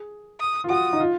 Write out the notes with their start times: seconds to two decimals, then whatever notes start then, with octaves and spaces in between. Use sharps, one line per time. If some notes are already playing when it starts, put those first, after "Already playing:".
Already playing: G#4
0.40 D#6
0.64 F4
0.70 F#4 D#6
0.93 D#4
1.00 F4